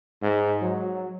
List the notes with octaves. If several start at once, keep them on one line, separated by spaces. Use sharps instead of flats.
G#2
F#3